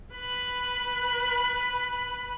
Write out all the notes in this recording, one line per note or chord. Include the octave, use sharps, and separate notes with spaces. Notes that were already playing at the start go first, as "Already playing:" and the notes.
B4 B5